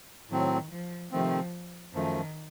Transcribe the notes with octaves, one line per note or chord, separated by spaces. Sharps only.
A2 D#3 F#3 C4
F3
C3 D#3 F3 A3 C4
F#2 D#3 F3 A3